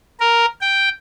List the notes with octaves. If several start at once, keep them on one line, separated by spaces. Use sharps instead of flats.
A#4
G5